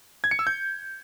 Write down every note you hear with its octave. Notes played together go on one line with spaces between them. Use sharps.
G#6
C#7
E6
G6